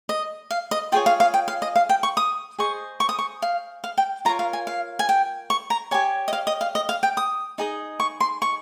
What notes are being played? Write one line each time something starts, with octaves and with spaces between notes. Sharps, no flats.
D#5
F5
D#5
F4 G#4 C#5 G5
F5
F5
G5
F5
D#5
F5
G5
C#6
D#6
G#4 C5 D#5 C#6
C#6
D#6
C#6
F5
F5
G5
F4 A#4 C#5 A#5
F5
G#5
F5
G#5
G5
C#6
A#5
G4 C#5 G#5
D#5
F5
D#5
F5
D#5
F5
G5
D#6
D#4 G#4 D#5
C#6
C6
C#6